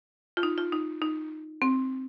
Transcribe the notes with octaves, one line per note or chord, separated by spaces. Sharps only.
F4
D#4
F4
D#4
D#4
C4